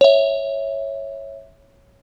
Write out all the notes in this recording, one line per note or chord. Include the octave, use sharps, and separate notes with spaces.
C#5 E5